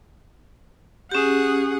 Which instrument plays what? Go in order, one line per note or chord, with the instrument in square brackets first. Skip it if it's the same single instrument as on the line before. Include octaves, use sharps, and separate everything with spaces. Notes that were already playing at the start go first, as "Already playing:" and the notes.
[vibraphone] C#4 G4 [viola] G#4 F#5